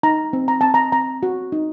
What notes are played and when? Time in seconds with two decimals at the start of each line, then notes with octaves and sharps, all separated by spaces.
0.03 D#4 A#5
0.33 C4
0.48 A#5
0.61 C4 A5
0.74 A#5
0.92 C4 A#5
1.23 F#4
1.52 D#4